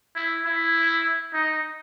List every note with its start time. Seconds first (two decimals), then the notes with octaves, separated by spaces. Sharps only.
0.16 E4
0.45 E4
1.34 D#4